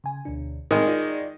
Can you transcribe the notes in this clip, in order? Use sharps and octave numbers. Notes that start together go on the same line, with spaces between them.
C#3 G#5
D2 B2 D4
A2 D#3 G#3 C4
F4 D5 D#5